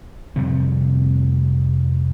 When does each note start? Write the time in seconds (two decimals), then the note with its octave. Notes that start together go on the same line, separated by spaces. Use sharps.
0.36 F2 C3 G3 C4